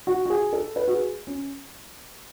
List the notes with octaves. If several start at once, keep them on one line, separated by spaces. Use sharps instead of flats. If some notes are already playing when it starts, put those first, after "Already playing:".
F#4
F#4
G#4
A4
B4
F#4
G#4
C#4